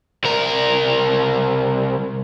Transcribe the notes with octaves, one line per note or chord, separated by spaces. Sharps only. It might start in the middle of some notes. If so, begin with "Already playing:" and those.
C2 A#4